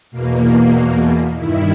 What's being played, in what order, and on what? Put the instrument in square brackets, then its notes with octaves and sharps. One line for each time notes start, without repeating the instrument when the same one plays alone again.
[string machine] E2 B2 A#3
G2 D#3 E4